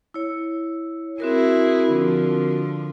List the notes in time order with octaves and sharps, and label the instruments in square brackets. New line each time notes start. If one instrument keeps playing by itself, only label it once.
[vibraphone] E4 C#5
[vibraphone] C4 F#4 A#4 [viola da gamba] E4 G#4
[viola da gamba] D3 F3